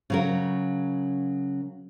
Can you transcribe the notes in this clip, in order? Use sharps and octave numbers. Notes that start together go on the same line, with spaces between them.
C#3 F#3 A#4